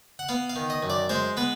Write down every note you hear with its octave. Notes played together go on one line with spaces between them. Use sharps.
F#5
B3 F5
F5
D#3
D#5
F#2
D5
G#3 C5
B3 B4